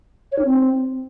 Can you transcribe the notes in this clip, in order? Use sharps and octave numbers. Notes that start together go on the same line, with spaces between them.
C#5
D#4
C4